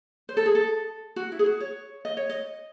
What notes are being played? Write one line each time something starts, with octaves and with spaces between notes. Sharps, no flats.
C5
A4
G#4
A4
F#4
E4
G#4
F#4
C#5
D#5
C#5
D#5